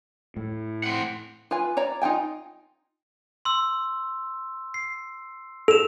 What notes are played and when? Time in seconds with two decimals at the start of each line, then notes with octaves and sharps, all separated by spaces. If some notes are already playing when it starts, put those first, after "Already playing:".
0.37 A2
0.84 C4 F#5
1.51 F4 B4 G#5
1.77 C#5 D5 A#5
2.02 D#4 F4 G5 G#5
3.45 C6 E6
4.74 C7
5.68 A4 E7 F7